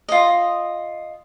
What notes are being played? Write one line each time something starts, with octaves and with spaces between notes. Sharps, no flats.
F4 D#5